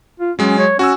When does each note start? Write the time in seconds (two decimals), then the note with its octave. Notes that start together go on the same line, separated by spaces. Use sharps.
0.20 F4
0.39 F#3 G#3 C#4
0.58 C#5
0.79 C#4 F#4 G#5 E6